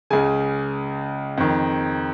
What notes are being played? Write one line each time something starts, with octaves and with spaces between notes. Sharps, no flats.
C#2 C#3 G#5
F2 D#3